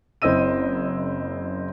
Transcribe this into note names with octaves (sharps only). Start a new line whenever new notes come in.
F#1 C4 E4 D#5 E6 D#7